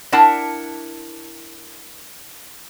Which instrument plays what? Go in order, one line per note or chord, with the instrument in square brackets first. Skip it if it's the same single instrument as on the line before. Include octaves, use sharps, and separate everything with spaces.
[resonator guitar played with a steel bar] D4 E4 A#4 F#5 A5